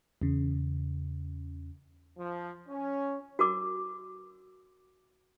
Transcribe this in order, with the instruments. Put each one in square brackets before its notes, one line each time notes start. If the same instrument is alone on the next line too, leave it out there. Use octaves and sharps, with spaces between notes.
[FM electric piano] E2 C#3
[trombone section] F3
C#4
[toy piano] F#4 A#4 D6